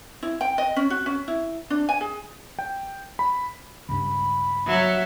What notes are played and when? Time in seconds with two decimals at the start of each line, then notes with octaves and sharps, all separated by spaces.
0.23 E4
0.41 G5
0.58 D#5
0.76 C#4
0.90 F#4
1.06 C#4
1.28 E4
1.70 D4
1.89 G#5
2.01 G#4
2.59 G5
3.19 B5
3.89 C#2 G2 B5
4.67 F#3 E5